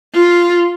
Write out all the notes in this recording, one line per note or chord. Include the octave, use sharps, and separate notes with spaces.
F4